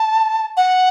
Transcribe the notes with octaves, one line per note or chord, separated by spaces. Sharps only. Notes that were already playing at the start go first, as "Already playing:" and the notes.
Already playing: A5
F#5